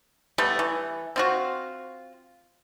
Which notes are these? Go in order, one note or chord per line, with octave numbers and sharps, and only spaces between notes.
G3 A3 B3
E3
C4 F4 F#4